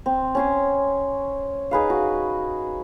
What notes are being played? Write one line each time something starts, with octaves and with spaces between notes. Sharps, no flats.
C4
C#4 G#5 C6
D#4 G#4 B4 F5
F#4